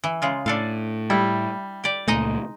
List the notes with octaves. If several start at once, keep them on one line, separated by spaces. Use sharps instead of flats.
E3
C#3 G#3 F4
A2 D4 A4 F5
G3 E4
G4 D5
C#2 A#2 G#3 A3 D#4 D#5